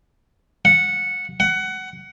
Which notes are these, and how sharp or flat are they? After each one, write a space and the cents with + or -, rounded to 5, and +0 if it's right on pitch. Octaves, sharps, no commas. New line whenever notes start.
F#5 -10
F#5 +20